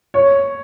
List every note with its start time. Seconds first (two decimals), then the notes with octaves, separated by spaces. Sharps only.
0.14 C#5